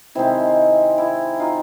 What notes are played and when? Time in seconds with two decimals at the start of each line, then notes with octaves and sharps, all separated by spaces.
0.15 C3 D#3 G#3 C4 E4
0.98 E4
1.40 D#4 F4